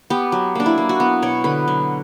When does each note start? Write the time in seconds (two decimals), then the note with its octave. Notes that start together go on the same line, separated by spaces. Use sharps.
0.10 B3 G4
0.32 F#3
0.55 A#3 D4
0.66 E4
0.78 A#3
0.89 F#4
1.00 B3
1.22 B2 C#5
1.44 D3 B4
1.68 F#3